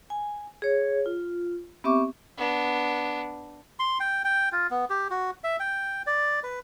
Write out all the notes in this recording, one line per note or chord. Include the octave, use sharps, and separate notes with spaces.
G#5
G#4 C#5
F4
B3 C4 G4 E5 C#6 D6
B3 D4
C6
G5
G5
F4
B3
G4
F#4
E5
G5
D5
B4